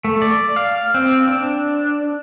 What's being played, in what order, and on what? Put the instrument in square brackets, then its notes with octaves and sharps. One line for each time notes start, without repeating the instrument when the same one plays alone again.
[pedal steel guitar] A3
D5
F5
C4
D4